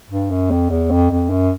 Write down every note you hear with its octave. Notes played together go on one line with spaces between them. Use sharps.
G2
F#2
F2
E2
F2
F2
F#2